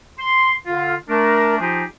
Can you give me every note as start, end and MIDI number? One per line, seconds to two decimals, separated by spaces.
0.19 0.55 84
0.66 0.95 50
0.66 0.95 65
1.09 1.57 57
1.09 1.57 62
1.09 1.57 70
1.60 1.84 53
1.60 1.84 63
1.60 1.84 65
1.60 1.84 67
1.60 1.84 68
1.60 1.84 80